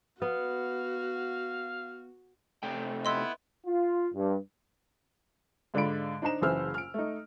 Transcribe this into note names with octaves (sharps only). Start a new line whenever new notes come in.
B3 F#4 F5
C3 A3 G5
B3 E4 D#5 C6 E6
F4
G2
G#2 D3 D5 F5 B5 D7
D4 D#4 C5 A#5 E7
F#1 C#3 E3 C5 E6 F6
F6 D7
A3 D#4